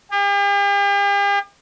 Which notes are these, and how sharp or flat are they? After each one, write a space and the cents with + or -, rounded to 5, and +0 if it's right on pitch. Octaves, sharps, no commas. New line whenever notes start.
G4 +45